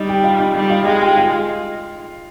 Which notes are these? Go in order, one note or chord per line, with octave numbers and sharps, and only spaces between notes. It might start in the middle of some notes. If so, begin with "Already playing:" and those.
Already playing: G3 D#4 D#5
G4 G5
F4 F5
D#4 D#5
G3 D#4 D#5
F4 F5
G#3 F4 F5
G4 G5
F4 F5